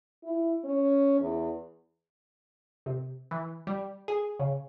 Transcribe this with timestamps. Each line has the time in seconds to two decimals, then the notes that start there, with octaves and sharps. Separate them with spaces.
0.23 E4
0.64 C#4
1.20 E2
2.86 C3
3.31 E3
3.67 G3
4.08 G#4
4.40 C#3